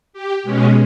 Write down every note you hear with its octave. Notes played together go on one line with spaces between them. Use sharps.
G4
B2 G#3 C#4